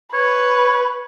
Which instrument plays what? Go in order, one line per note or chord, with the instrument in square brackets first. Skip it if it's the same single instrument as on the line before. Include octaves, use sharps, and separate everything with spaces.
[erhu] B4 [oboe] C#5